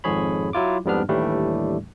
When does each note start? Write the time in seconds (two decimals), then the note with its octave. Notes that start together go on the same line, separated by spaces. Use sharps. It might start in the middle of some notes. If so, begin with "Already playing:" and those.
0.04 G#1 F2 G#2 G#4 C#5 B5
0.53 F#3 E4 F4 D6
0.85 F2 G#2 G3 B3 D4 F6
1.08 D#2 A2 E3 G3 A3 D4